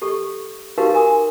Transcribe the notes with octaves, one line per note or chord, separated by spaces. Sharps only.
G4 A4 C#6
D#4 F#4 G4 A#4 B4 F5
A#4 G#5 C6 D#6